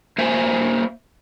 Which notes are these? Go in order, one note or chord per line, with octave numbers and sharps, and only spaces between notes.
A#3 C5 E5 G#5